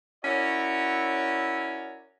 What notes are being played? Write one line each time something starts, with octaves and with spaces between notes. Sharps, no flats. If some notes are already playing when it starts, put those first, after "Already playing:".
C#4 E4 F#4 A#4 C#5 D5